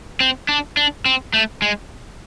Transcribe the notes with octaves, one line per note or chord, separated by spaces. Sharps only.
C4
D4
D4
C4
A3
G#3